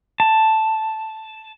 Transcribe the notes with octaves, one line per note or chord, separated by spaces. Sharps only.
A5